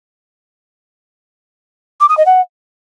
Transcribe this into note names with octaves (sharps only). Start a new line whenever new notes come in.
D6
D#6
D#5
F#5